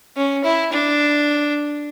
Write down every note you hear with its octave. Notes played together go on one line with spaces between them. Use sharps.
C#4
E4
D4